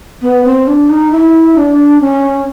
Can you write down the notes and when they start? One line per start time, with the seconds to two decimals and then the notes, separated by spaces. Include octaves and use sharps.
0.21 B3
0.44 C4
0.67 D4
0.89 D#4
1.11 E4
1.55 D4
2.00 C#4